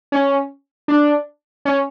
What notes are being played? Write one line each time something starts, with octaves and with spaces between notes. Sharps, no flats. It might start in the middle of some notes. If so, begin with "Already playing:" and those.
C#4
D4
C#4